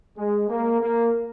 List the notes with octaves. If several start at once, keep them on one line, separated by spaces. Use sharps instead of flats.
G#3
A#3
A#3